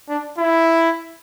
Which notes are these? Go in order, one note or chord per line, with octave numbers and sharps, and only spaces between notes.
D4
E4